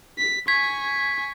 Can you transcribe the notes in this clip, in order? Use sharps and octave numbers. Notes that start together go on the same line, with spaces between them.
B6
G#5 C#6 G#6 B6